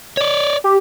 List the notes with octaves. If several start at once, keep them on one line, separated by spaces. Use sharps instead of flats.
C#5 D5
G4